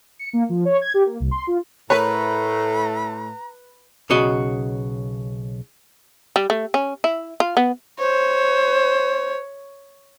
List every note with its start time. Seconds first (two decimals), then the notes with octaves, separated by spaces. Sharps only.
0.19 C#7
0.33 A#3
0.49 F3
0.65 C#5
0.81 G#6
0.94 G4
1.06 A#3
1.20 C2
1.31 C6
1.47 F4
1.90 A2 A3 A#4 B4 C#5 A#5
4.10 B1 C#3 F#4 D#5
6.36 G3
6.50 A3
6.74 C#4
7.04 E4
7.40 F4
7.57 B3
7.99 C5 C#5